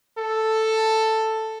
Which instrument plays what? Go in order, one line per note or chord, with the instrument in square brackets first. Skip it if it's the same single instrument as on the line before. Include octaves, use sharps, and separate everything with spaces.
[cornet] A4